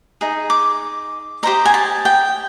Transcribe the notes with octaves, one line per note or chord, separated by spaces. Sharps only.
D#4 G#4
D6
G4 C5 D#5 A#5
G#5
A5
G5